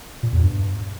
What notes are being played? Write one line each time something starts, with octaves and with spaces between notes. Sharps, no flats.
A#2
E2
G2